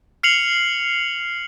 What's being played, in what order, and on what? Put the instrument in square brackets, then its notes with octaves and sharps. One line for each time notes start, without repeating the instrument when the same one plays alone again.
[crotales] F6 C7 C#7 F7 F#7